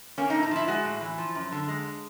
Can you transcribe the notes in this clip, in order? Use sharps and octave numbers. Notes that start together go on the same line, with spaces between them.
A#3 C#4
D#4
A2
D#4
F3 E4
G#3 F#4
A2
E3
F3
F#2
D3
G#3